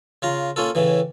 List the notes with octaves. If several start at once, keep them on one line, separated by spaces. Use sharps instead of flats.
C#3 F4 A#5
A#3 C#4 F4 A4
A2 C#3 E3